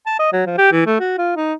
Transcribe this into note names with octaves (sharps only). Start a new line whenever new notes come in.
A5
D#5
F#3
F3
G4
E3
A3
F#4
F4
D#4